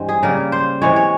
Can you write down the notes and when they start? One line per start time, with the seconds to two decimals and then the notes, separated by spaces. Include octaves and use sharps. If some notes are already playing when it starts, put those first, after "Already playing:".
Already playing: G2 E3 G#3 C4
0.09 G#4
0.23 C#3 G3 A#3 A#4
0.52 C5
0.82 C3 E3 G#3 C#5
0.96 C#5